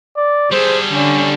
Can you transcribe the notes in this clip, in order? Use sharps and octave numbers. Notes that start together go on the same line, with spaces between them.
D5
G3 G#4 A4 C5
D3 C#4